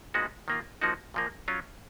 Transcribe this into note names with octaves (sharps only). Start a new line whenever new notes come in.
A#2 G#3 B3 D#4 F#4
D#3 A#3 F4
F3 A#3 D#4 F#4
A#2 F3 A#3
F#3 C#4 F4